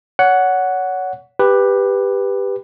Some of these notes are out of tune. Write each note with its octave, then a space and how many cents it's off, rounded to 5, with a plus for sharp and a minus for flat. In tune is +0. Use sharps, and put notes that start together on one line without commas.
C#5 +30 F#5 +0
G4 +10 B4 +0